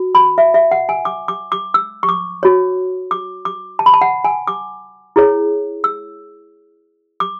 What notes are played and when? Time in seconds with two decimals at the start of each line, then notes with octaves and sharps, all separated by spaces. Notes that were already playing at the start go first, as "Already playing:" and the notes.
Already playing: F#4
0.15 B5
0.38 E5
0.54 E5
0.71 F#5
0.89 G#5
1.05 D6
1.28 D6
1.52 D6
1.74 E6
2.03 C#6
2.09 D6
2.43 F#4 C#5
3.11 D6
3.45 D6
3.79 A5
3.86 B5
3.94 A5
4.01 F#5
4.24 G#5
4.47 D6
5.16 E4 G#4 C#5
5.84 E6
7.20 D6